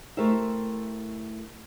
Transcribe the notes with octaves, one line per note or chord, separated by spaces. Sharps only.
A3 E4 G4 A#4 C5 E5